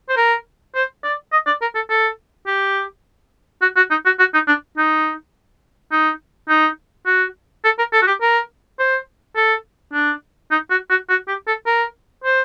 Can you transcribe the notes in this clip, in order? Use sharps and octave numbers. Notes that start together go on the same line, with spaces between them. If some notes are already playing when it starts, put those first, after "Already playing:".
C5
A#4
C5
D5
D#5
D5
A#4
A4
A4
G4
F#4
F#4
D#4
F#4
F#4
D#4
D4
D#4
D#4
D#4
F#4
A4
A#4
A4
F#4
G4
A#4
C5
A4
D4
D#4
F#4
F#4
F#4
G4
A4
A#4
C5